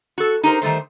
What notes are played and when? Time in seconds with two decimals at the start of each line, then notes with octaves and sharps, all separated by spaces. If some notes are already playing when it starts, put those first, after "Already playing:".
0.18 F#4 A4
0.43 D#4 G4 A#4 C5
0.62 D#3 G3 A3 C5